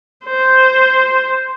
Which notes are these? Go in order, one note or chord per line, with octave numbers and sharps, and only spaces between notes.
C5